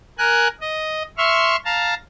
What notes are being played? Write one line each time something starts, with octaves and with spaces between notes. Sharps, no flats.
A#4 G#5 F#6
D#5
E5 C6 C#6 F6
F5 A5 A#5